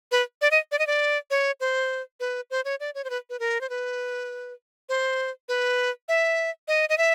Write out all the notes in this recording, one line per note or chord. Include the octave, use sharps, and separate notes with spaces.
B4
D5
D#5
D5
D#5
D5
C#5
C5
B4
C5
C#5
D5
C#5
C5
B4
B4
A#4
C5
B4
C5
B4
E5
D#5
D#5
E5